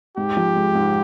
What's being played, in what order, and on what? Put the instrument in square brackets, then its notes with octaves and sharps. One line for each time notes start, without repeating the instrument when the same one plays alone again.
[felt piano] G#2 [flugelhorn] G4
[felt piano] F3
G#3
G#2